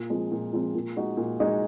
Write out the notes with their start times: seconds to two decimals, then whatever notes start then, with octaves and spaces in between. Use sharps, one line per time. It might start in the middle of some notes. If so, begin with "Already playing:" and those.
Already playing: A#2
0.10 F3 G#3 C4
0.32 A#2
0.53 F3 G#3 C4
0.74 A#2
0.97 G#3 D#4 F#4
1.17 A#2
1.40 G#3 D#4 F#4